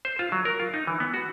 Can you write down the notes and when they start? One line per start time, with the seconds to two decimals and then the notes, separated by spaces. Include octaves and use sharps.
0.05 C5
0.19 F4
0.32 F#3
0.45 A#4
0.60 F4
0.74 D#4
0.87 E3
1.00 B3
1.14 F#4